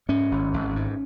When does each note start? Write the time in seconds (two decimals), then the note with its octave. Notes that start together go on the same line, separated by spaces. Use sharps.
0.09 G#2 C#4
0.31 G#1
0.54 G#1
0.76 G#2